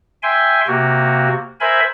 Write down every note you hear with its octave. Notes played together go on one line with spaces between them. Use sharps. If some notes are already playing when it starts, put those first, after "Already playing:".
E5 G5 G#5 C6
C3 A#3 F#4
A#4 C5 E5 G#5 B5